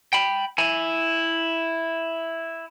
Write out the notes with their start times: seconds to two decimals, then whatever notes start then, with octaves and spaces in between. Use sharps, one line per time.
0.13 G5 B5
0.58 E4 G#5